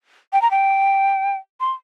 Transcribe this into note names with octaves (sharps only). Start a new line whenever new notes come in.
G5
A#5
G5
C6